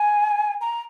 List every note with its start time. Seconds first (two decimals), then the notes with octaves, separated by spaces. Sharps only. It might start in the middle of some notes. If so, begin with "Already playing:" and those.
Already playing: G#5
0.61 A#5